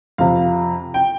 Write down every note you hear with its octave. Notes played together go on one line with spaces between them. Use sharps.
F2 C3 F3 F5
G5